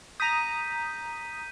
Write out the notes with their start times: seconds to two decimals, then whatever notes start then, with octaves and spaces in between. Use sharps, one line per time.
0.20 A#5 D#6 G6 B6 D#7